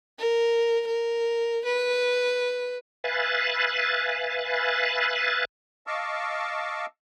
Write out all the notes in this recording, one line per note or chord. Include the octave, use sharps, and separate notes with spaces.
A#4
A#4
B4
B4 E5 F5 G#5 F#6 A6
D#5 F5 A5 C#6 D6 E6